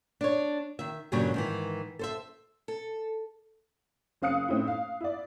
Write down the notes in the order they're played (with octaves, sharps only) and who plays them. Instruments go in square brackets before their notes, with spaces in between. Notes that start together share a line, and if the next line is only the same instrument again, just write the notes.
[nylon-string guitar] D4 C#5
D#3 E5
G2 A#2 C#3 F#3 G3 F#4
G#2 D#3 E3
A4 C5 E5
[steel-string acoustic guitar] A4
[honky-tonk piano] F#1 C4 F5 D#6 F#6 C#7
A2 A3 C4 D#4 E4
F5
E4 D5